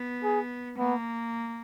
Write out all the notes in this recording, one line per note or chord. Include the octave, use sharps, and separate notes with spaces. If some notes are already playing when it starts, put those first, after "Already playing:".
Already playing: B3
G#4
A#3 B3